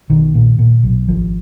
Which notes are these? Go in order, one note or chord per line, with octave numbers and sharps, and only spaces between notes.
B1 D#3
A#2
A#2
B1
G#1 F3